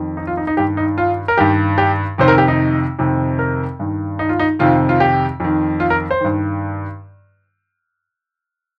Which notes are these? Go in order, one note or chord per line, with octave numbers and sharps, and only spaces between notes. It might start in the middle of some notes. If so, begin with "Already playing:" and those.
Already playing: F2 D#3
D#4
F4
D#4
D#4
G2 D#3 G4
D#4
F4
A#4
G2 D#3 G4
G4
F2 C3 D#3 C5
A#4
G4
D#4
F2 C3 D#3
A#4
G2 D#3
D#4
F4
D#4
F2 C3 D#3 F4
F4
G4
F2 D#3
F4
A#4
C5
G2 D#3